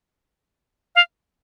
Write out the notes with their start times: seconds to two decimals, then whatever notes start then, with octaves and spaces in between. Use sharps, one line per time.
0.95 F5